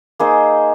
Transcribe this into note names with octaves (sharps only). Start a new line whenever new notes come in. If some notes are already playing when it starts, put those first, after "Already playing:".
A#3 D#4 G#4 C5